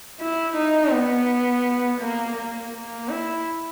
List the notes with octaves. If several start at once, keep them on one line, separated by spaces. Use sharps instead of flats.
E4
D#4
B3
A#3
A#3
A#3
E4